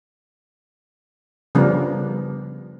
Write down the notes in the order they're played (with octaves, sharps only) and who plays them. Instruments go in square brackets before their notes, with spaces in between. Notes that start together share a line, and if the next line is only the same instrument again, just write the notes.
[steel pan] C#3 F3 G3 B3 D4 A#4